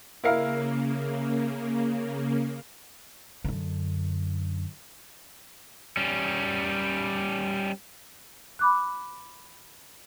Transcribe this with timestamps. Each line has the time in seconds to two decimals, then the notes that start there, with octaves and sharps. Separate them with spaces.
0.24 C#3 A#3 E4 A#4 F5
3.44 F#2 D3
5.97 G3 C#4
8.59 B5 D6 F#6